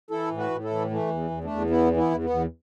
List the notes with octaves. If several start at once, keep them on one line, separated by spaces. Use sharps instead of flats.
E3 E4 A4
A2
F#4 B4
A2
E4 A4
E3
E3 A3
E2
E2
A3 D4
E2
E3 B3 E4
E3
B3 E4
E2
B3
E2